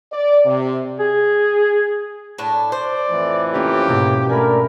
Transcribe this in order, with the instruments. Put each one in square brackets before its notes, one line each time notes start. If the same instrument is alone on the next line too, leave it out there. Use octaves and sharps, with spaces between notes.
[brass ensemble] D5
C3
[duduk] G#4
[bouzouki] A2 D4 A5
[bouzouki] C5 [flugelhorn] D5
[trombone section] F2 A2 E3
[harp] A#3 C#4 F4 [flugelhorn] G4
[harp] G#2 B2 A#3
[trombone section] A3 D4 A#4 [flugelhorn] D5 [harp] G#5 B5